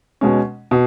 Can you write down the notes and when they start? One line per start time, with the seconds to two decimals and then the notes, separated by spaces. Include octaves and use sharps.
0.21 B2 G#3 C#4
0.71 B2